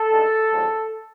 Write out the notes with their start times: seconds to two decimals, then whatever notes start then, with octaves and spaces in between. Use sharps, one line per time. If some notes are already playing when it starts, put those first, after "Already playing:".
Already playing: A4
0.10 G2 D#3 G#3
0.50 D#2 D3 F3 G#3 C4